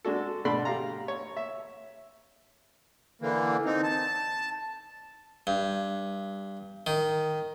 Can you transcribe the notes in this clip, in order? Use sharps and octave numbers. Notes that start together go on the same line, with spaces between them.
G#3 D4 F#4 A4
B2 D3 A3 D5 B5 C6
G4 F5 A#5
C#5
E5
D3 E3 A#3
C4 D#4
A5
G2
D#3